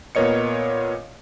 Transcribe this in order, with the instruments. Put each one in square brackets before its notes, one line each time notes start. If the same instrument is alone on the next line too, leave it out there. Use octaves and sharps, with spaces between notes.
[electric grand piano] A#2 B3 A#4 C#5 D#5 C#7